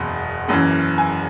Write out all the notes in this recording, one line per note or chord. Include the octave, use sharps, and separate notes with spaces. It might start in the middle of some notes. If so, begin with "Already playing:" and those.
Already playing: F#1 E2 B2
F#1 F#2 E3
G#5